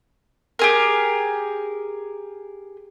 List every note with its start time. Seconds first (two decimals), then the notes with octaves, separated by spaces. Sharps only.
0.59 G4 G#4 A#4